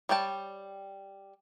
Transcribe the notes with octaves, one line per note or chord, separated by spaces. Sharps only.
G3 C#5 G5 A5